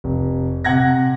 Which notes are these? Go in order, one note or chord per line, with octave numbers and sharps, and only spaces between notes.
F1
C3 F#5 G#6 A#6